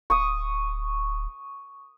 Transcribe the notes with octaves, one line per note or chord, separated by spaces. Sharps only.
D1 C#6 D#6